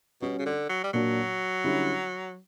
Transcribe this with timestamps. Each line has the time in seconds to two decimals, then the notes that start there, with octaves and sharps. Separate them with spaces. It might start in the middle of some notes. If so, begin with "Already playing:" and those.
0.22 B2 G3 C#4 F#4
0.39 C#3
0.46 D3
0.69 F#3
0.84 G3
0.93 A#2 F#3 A#3 D4 F#4
1.64 D3 G3 C#4 E4